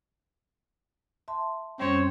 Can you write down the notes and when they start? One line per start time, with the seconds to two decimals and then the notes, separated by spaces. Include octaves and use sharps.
1.28 E5 A5 C6
1.78 F#2 G3 C4 C#4 C5 C#5